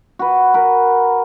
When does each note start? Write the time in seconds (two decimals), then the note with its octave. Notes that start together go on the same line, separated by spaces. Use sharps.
0.19 F#4 B4
0.54 A#4 B4